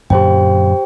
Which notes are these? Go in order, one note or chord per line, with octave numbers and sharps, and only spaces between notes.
F#2 A#2 D3 G4 C5 G5